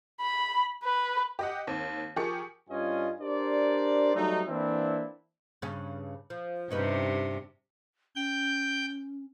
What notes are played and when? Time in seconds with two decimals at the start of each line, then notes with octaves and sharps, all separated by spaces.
0.21 B5
0.83 B4
1.39 G4 D#5 F#5
1.67 D#2 C4
2.16 F3 G4 G#4 A#4 C#6 C#7
2.69 G2 G3 C#4 F4 D#5 G#5
3.20 D4 G4 A#4 C5 D5
4.15 F#3 G3 A3 D#4
4.48 E3 A#3 C4 D4 E4
5.62 G2 C#3 C#4
6.30 F3
6.70 G2 C3 C#4 D#4 B4
8.15 C#4 G5 G6